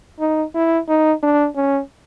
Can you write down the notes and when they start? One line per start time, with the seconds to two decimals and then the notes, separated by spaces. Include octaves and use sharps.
0.20 D#4
0.54 E4
0.89 D#4
1.23 D4
1.56 C#4